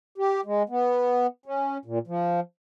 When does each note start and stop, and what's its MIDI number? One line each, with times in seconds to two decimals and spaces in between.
0.18 0.41 67
0.45 0.63 56
0.69 1.27 59
1.46 1.77 61
1.85 1.99 46
2.07 2.40 53